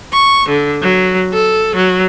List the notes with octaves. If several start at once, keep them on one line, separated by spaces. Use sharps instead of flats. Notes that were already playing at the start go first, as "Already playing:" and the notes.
C#6
D3
F#3
A4
F#3